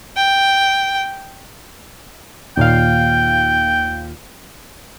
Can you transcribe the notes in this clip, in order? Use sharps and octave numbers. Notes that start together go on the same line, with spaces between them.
G5
D#2 A#2 F5 G5